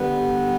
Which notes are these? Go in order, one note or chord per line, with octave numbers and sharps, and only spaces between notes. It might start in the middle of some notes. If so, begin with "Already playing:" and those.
Already playing: D3 G3 B3